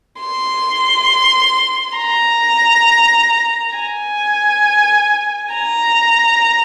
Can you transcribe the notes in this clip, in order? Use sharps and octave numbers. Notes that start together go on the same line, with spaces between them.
C6
A#5
G#5
A#5